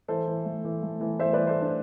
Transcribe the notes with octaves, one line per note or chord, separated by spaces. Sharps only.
E3 A4 C5
E3
A3
E3
A3
E3
E3 C5 E5
B4 D5
E3
A4 C5
E3
D4